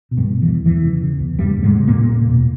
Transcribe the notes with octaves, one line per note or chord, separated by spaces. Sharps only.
B2
G2 G3
B2
E3
E2
E2 E3
C#3
C#3
E2
E2 G2 G3
C#3
G#2 G#3
C#3
A#2 A#3
E2
E2
B2